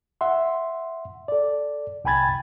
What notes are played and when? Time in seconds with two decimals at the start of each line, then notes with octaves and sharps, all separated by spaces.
0.21 E5 F#5 C6
1.28 A4 D5
2.04 C2 G5 G#5 B5 G#6 A6